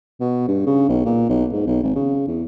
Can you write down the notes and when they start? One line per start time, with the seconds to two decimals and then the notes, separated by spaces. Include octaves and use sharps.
0.21 B2
0.48 G2
0.66 C#3
0.89 B1
1.06 A#2
1.29 B1
1.53 G#2
1.66 B1
1.83 G#1
1.95 C#3
2.27 E2